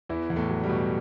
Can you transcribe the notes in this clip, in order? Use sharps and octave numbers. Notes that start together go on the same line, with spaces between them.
E2 E3 E4
E2
A2 A3
F#3
G3
B2